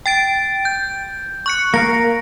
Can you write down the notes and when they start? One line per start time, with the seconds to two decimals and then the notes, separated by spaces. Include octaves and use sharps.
0.06 G5 A6 D7
0.65 G6
1.46 C#6 F#6 C#7
1.74 A#3 A#4 F5 A#6